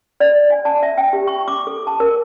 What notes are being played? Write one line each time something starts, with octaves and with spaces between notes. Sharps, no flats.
D5
G#5
A5
E5
G5
G4
C#6
D6
A4
A5
A#4